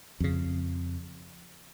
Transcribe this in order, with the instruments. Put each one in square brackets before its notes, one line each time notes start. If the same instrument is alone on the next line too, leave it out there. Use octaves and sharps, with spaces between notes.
[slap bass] F2 C#3